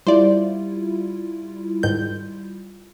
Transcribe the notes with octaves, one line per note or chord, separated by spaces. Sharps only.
G3 E4 F4 C5 D5
G#2 D#3 G6